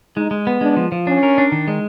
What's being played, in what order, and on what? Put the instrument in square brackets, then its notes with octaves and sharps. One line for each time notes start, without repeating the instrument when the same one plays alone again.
[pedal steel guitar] G#3 [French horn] D#4
[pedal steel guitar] G#3
B3
[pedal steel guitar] G#3 [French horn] D4
[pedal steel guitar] F3
F3
[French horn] C#4 [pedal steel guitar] D4
[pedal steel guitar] A#4
D4
D#3
G#3